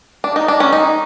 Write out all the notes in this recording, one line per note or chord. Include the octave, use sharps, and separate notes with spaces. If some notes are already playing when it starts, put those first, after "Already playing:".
D4
D#4
D4
C#4
D#4